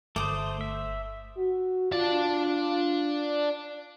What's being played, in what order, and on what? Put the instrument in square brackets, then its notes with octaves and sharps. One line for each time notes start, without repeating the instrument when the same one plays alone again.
[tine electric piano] G1 [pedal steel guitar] A3 C5 [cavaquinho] D6 D#6
[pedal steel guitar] E5
[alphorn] F#4
[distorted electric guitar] D4 A5 [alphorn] F4